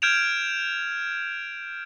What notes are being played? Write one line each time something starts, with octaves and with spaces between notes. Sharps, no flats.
F6 G6 G#6 D7 E7 F7